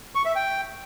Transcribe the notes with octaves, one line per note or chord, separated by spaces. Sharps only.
C#6
E5
G5